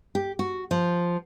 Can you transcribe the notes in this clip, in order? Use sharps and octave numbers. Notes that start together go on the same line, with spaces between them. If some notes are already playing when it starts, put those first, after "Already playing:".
G4
F#4
F3